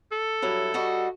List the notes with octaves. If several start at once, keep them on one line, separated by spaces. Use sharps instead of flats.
A4
G2 F#3 E4
G3 F#4 D#5